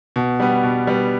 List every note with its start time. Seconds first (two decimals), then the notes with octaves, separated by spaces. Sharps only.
0.16 B2
0.40 G3 B3
0.63 B2
0.87 G3 B3